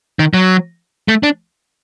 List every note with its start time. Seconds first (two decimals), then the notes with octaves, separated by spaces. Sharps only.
0.19 D#3
0.34 F#3
1.08 A3
1.23 D4